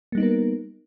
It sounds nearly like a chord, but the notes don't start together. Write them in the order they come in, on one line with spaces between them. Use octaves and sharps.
A#3 G3 D#4 B3 A#4